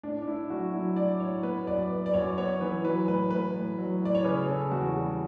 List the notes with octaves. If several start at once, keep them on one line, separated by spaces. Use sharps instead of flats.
A2 D4
D4
A2 E4
F#3 F#4
F#3 E4
A2 D5
A2 C#5
B3 B4
F#2 D5
B3
D5
F#2 C#5
B3 C#5
E3 B4
F#3 B4
A2 B4
A2 B4
A2
F#3
A2 D5
C#5
C#3 B4
C#3 A4
E2 F#4
G3